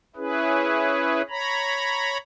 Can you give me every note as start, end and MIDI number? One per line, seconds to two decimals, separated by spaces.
0.16 1.22 61
0.16 1.22 64
0.16 1.22 68
0.16 1.22 71
1.29 2.17 73
1.29 2.17 82
1.29 2.17 83